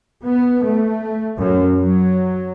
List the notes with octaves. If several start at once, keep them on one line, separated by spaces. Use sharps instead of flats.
B3
A3
F#2
F#3